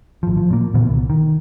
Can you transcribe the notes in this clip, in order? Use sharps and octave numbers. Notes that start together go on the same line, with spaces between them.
G#1 F3
F3
A#2 A#3
A#2 D3 E3 B3
C2
D#3